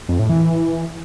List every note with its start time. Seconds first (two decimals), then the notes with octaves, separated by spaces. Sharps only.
0.09 F2
0.19 A2
0.30 E3